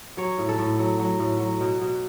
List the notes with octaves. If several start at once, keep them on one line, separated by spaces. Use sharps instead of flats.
F#3 C#5
A2
A4
A2
F#3
F#3
A2
F#3
B2
B2